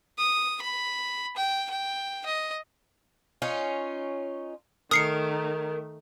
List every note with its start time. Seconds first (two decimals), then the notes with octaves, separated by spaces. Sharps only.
0.18 D#6
0.62 B5
1.37 G5
1.70 G5
2.26 D#5
3.42 C#4 D#4 F4
4.91 D#3 A3 A#4 D#6 C7 C#7